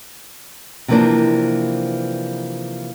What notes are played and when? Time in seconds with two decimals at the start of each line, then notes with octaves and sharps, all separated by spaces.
0.88 C3 E3 F3 A#3 C4 D4